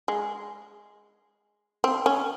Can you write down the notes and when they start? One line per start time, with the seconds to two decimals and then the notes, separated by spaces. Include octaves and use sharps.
0.08 G#3
1.84 C4
2.06 C#4